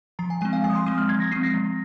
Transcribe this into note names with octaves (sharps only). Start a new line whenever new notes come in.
F3 A#5
G#5
G#3 C4 G#5
F5
F3 G#5
D#6
C6
G#3 C4 D#6
F6
F3 G#6
A#6
G#3 C4 C7
A#6
F3